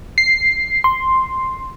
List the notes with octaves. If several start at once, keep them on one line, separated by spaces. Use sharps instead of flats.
C7
C6